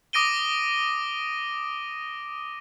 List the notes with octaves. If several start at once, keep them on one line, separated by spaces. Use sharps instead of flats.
D6 D#6 A#6 D7 D#7 G7